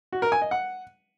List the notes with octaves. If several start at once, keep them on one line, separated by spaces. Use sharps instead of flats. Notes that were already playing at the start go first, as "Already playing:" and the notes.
F#4
A#4
G#5
D#5
F#5